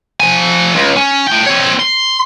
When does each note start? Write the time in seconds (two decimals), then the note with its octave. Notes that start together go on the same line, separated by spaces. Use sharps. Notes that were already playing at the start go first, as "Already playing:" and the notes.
0.20 F3 G#5
0.76 C#2
0.97 C#4
1.27 A3 G5
1.47 C4 C#5
1.80 C6